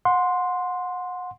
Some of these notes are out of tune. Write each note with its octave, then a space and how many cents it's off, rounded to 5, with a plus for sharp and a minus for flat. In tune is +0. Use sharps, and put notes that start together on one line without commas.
F#5 -30 C6 +0